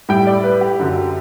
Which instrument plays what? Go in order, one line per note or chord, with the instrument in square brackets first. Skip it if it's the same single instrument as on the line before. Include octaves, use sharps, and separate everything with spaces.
[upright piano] A2 G3 G5
D5
B4
G4
F#2 D3 F#3